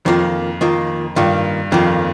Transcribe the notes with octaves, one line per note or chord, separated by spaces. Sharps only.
F2 D#3 A#3 F4
D#3 A#3 F4
G2 D#3 A#3 F4
F2 D#3 A#3 F4